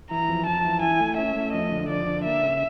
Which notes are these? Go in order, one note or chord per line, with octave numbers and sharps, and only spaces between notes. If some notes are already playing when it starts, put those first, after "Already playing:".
E3 A#5
F2
F2 A5
E3
E4 G#5
A3
C#4 E5
A3
F2 D#5
D3
F2 D5
D3
A#3 E5
C#3